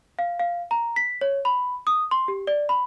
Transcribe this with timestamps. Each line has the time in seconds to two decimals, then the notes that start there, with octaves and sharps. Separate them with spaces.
0.19 F5
0.40 F5
0.71 A#5
0.96 B6
1.21 C#5
1.45 B5
1.87 D#6
2.11 C6
2.28 G4
2.47 D5
2.69 B5